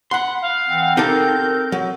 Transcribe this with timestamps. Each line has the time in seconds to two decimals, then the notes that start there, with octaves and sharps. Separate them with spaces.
0.11 F#5 B5 C6
0.42 F5
0.68 E3 C4 F#5
0.97 C4 D#4 G4 A4 A#4 G6
1.72 F#3